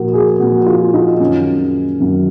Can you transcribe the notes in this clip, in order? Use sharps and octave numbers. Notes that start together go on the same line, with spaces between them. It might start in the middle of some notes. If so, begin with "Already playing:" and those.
Already playing: A#2 F3 F#4 A#4
G#4
A#2 F3 F#4
F4
D#4
F#2 D#3 F#3 C#4
F#2 D#3 F#3